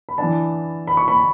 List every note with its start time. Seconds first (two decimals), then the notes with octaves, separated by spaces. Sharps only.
0.09 B5
0.18 E3 B3 D4 A5
0.87 B5
0.97 C#6
1.08 B5